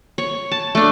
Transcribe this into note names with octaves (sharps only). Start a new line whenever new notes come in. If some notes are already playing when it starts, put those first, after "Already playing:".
C#5
A5
A3 D4